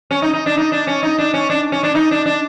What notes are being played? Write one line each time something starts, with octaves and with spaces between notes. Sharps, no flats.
C#4
D#4
D#4
D4
D#4
D4
C#4
D#4
D4
C#4
D4
C#4
D4
D#4
D4
D4